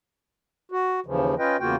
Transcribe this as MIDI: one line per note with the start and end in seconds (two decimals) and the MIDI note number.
0.72 1.00 66
1.06 1.35 39
1.06 1.35 49
1.06 1.35 52
1.06 1.35 53
1.39 1.57 61
1.39 1.57 65
1.39 1.57 71
1.39 1.57 75
1.39 1.57 79
1.60 1.76 40
1.60 1.76 49
1.60 1.76 58
1.60 1.76 65
1.60 1.76 66
1.60 1.76 79